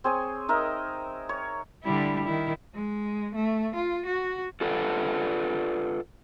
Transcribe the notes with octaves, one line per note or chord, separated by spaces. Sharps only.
C4 G#4 C#5 G#5
D#4 A#4 D#5 E5
C#5
D3 G3 E4
D#3 E4
G#3
A3
F4
F#4
F4 A4 B4 D5 F#5